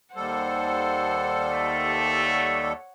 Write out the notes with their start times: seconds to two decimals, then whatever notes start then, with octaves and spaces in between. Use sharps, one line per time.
0.16 D#2 G3 A4 C5 F#5
1.52 A3
2.24 C#5 F#5